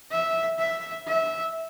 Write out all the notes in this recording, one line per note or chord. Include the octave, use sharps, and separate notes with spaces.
E5
E5
E5